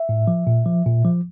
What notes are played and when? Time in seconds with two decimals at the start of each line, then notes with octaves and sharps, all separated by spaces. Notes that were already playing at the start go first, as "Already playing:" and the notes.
Already playing: E5
0.09 A2
0.28 F3
0.47 A#2
0.66 F3
0.86 A#2
1.05 F3